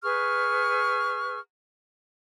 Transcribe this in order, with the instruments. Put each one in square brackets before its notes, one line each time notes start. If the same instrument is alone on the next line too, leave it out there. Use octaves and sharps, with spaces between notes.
[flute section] G#4 B4 C#6 F6